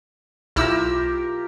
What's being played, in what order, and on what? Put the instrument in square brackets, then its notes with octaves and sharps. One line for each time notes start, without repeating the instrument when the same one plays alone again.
[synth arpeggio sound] B1 E4 E6 [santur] F4 G4 A#4